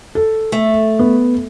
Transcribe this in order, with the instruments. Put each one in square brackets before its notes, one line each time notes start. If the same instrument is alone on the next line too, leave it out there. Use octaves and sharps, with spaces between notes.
[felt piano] A4
[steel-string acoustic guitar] A3
[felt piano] B3